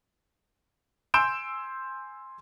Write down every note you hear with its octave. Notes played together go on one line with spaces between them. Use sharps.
G#5 C6 E6 G6 D7 E7